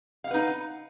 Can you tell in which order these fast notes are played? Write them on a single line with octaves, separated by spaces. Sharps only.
F5 F#5 B4 D#4